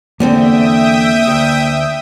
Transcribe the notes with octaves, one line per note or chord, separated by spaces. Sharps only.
E2 D3 A#3 C4 E5 G5 D#6
D2